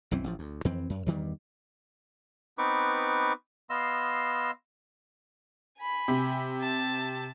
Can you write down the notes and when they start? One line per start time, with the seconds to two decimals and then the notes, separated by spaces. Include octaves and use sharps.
0.11 B1 F#2 E3 C4
0.24 A1 F3
0.39 D2
0.65 F2 E3 C4
0.90 F#2
1.06 E2 G2 D#3 G3
2.58 B3 C4 D#4 B4 C#6 D6
3.70 B3 D#5 F5 C6 E6
5.78 G#5 B5
6.08 C3
6.61 A5